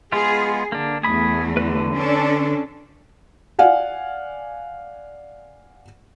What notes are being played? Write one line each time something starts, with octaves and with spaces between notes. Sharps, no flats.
G#3 B3 F4 G#4
D3 A#3 D4
E2 A3 G#4 B5 D#6
D3 B4
C#4 D4 A4
D5 F5 F#5 G#5